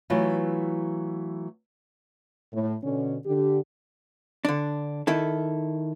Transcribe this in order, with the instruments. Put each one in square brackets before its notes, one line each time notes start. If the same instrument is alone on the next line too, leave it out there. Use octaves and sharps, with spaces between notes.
[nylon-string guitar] E3 F#3 A3 B3 E4 F4
[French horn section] A2
B2 D3 C#4
D3 G4
[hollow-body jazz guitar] D3 D4
D#3 E4 A4